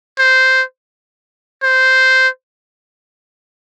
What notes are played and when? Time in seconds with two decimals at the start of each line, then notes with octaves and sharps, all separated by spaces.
0.19 C5
1.63 C5